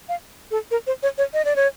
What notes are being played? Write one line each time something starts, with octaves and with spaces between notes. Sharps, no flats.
F5
A4
A#4
C5
C#5
C#5
D#5
D5
C#5